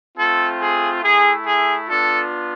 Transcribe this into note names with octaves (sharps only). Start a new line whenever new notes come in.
A3 C4 F4 A4
G#4
A3 E4 G#4
G#4
B3 D4 F4 A4